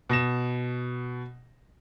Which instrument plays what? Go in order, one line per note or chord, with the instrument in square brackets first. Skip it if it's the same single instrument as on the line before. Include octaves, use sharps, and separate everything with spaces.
[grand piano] B2 A#6 E7